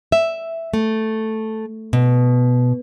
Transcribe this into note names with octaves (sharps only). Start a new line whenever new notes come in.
E5
A3
B2